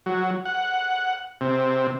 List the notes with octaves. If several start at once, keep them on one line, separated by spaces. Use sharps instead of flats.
F#3
F#5
C3